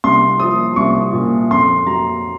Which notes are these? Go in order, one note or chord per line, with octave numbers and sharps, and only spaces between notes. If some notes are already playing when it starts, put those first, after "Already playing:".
C2 C6
F3 D#6
C2 C#6
A#2
F2 C6
F#3 A#5